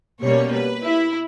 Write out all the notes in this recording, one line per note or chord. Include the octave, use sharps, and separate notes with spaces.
B2 G3 A#3 C#4 C#5
B4
E4